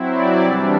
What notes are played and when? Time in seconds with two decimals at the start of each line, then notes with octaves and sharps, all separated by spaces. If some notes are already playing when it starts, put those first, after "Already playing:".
Already playing: F#3 C4 E4
0.12 D5
0.41 C3 E3 G3 D4 E5